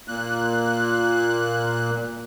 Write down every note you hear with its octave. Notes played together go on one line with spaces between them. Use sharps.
A#2 A#3 F#6